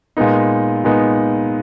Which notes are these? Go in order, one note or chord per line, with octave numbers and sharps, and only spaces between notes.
A#2 G#3 B3 D#4
A#2 G#3 B3 D#4